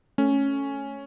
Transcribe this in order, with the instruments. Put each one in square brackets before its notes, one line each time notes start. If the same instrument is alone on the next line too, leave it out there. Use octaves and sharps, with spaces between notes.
[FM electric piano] A3 [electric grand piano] C#4